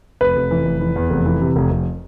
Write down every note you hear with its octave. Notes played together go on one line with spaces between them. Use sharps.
F1 B4
F1
E3
F1
E3
E2
F1
E3
C3
F1
F1